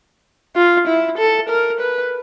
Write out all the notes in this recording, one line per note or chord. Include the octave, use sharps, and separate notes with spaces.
F4
E4
A4
A#4
B4